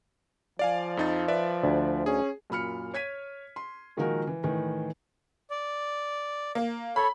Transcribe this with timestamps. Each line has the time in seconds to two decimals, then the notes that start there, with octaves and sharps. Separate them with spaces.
0.59 F3 D5 F5 G#5
0.97 F2 D#4 A6
1.28 B4 D5 E5
1.64 D2
2.06 C#4 G#4
2.50 F#2 A#2 B5 F6 C#7
2.94 C#5 G#6 B6 D#7
3.56 C6
3.97 A#2 D#3 F3 G#3 F#4 A#4
4.27 E3
4.43 A2 D#3 E3
5.50 D5
6.55 A#3
6.96 A4 C#5 B5